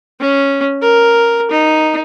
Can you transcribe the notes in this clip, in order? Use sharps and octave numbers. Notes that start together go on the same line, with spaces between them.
C#4
A#4
D#4